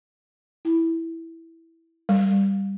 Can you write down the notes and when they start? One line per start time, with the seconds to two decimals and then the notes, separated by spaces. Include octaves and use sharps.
0.65 E4
2.09 G3